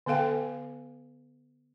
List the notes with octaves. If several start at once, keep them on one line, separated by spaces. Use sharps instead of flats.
D3 B3 A4 F5 G5